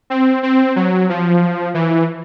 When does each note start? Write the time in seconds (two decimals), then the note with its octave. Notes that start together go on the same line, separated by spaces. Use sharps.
0.10 C4
0.43 C4
0.76 F#3
1.09 F3
1.74 E3